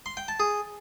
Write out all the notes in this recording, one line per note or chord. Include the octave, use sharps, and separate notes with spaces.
C6
G5
A5
G#4